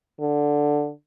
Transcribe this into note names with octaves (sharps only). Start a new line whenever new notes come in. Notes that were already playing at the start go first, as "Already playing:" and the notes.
D3